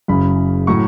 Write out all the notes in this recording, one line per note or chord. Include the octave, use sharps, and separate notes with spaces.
F#1 F#2 C#3 B5
A2 F#3 A3 C#6